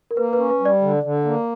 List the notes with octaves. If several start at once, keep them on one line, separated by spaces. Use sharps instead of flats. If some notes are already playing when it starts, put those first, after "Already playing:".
A#4
A#3 B4
B4
C#4
B4
G3
D5
D3
D3
A#3